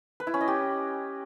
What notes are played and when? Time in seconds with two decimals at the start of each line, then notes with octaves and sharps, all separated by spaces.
0.20 B4
0.27 E4
0.34 C#4
0.41 D#5
0.48 G4